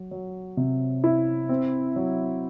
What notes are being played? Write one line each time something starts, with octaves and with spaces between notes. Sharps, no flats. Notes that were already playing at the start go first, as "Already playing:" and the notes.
Already playing: F#3
F#3
C3
E4
C4
F#3